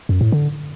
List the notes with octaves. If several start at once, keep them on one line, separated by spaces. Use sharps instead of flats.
F#2
A2
D3